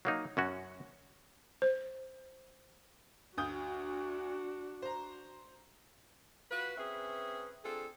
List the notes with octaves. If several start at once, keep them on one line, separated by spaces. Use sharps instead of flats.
F#3 A#3 D#4
F#2 C#4 F#4
C5
D2 D4 F#4 D#6 G6
C5 A#5
F4 F#4 B4
C4 C#4 G#4 B4 E5
C4 D4 F4 G#4 A4